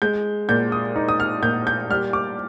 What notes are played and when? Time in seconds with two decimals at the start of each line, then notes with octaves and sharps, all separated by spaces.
0.02 G#3 G6
0.49 A#2 G6
0.72 D#6
0.96 D#4
1.09 D#6
1.20 F6
1.42 A#2 G6
1.67 G6
1.90 G3 F6
2.13 D6